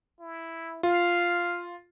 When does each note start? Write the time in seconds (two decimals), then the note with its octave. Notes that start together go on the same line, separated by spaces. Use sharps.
0.20 E4
0.83 F4 F5